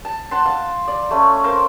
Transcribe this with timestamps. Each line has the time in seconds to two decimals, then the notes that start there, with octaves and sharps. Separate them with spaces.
0.05 A5
0.31 F#5 A5 C6
0.46 F5 A5
0.88 D5
1.11 A3 C#4
1.44 A#4 C5 F5 C6